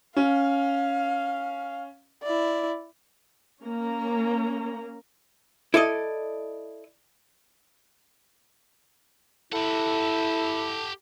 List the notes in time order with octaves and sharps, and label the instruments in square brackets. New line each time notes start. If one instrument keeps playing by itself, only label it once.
[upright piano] C#4 [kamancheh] F5
[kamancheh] E4 D5
[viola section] A#3 C#4 A#5
[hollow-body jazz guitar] E4 A4 D5 D#5
[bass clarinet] E4 [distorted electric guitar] G4 F#5 [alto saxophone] A4